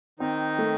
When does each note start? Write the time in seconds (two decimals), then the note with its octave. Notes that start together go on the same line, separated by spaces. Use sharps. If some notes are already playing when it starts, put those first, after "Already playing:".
0.20 D#3 C4 D#4
0.59 A3